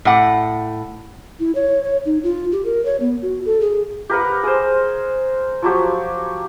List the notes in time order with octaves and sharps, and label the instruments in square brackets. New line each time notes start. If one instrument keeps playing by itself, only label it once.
[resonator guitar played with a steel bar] A2 F#5
[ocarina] E4
C#5
C#5
D#4
F4
G4
A#4
C#5
B3
F#4
A4
G#4
[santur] G4 A#4 B4 F#5
G#4 C5
F3 F#3 G4 C#5